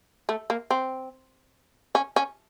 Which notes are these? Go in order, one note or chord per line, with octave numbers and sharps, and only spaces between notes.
A3
A#3
C4
C#4
C#4